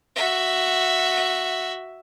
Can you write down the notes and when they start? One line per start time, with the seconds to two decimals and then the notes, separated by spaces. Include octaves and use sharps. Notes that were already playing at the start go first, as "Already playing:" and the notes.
0.16 F#4 E5